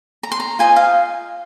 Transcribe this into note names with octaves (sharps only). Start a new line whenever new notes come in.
A#5
C6
A#5
F4 C5 D#5 G#5
F5